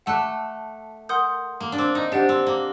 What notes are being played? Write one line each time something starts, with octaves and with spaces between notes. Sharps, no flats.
A3 F#5 A5 D6 F#6
A#4 F#5 C6 D#6 G6
A#3
D4
C4
D#4
D4 G4 C5 F#5
C4
A#3